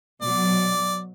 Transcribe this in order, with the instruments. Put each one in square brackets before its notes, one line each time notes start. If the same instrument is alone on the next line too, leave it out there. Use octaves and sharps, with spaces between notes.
[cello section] B2 F#3 [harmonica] D5